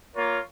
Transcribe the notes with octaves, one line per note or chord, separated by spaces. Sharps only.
A#3 F4 A#4 C#5